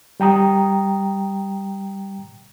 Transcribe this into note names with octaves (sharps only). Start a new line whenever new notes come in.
G3 G5 A#5 D#6